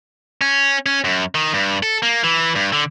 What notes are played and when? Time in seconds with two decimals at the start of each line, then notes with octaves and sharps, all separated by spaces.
0.41 C#4
0.86 C#4
1.04 F#2
1.35 D#3
1.54 G2
1.83 A4
2.03 A#3
2.24 E3
2.55 G2
2.73 D3